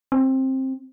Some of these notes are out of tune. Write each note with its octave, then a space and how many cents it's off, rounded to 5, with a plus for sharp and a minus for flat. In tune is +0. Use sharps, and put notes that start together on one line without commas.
C4 +15